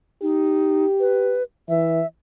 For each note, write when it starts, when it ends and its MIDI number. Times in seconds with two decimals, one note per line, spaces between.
0.22 0.85 63
0.22 1.39 67
1.00 1.43 71
1.69 2.00 52
1.69 2.06 76